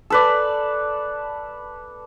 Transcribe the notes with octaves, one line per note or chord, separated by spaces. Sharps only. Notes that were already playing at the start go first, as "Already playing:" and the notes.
A4 B4 D5